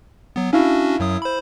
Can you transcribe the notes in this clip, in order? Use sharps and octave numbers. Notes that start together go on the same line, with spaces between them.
F#3 B3
C#4 D4 E4 F#4 F5
F#2 F#3 D#6
C5 B5